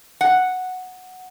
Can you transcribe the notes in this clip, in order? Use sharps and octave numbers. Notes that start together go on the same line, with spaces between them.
F#5